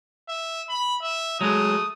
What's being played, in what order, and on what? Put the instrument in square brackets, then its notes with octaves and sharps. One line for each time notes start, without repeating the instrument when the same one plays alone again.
[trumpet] E5
B5
E5
[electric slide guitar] F#3 G#3 [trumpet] A3 [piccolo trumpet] D#6